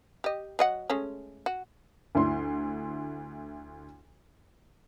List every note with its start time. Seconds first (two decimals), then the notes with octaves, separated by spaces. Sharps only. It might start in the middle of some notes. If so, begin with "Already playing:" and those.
0.24 G4 D#5
0.59 F#3 D#5 F#5
0.90 G#3 A3 C#4
1.46 F#4
2.15 D2 E4 C6